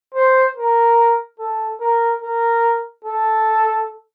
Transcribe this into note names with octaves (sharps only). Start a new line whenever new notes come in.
C5
A#4
A4
A#4
A#4
A4